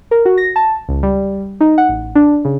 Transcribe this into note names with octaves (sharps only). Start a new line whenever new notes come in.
A#4
F#4
A#6
A5
C#2
G3
D#4
F#5
A1
D4
C#3